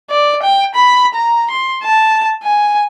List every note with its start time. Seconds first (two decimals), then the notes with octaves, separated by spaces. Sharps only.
0.10 D5
0.43 G5
0.75 B5
1.14 A#5
1.51 C6
1.84 A5
2.43 G#5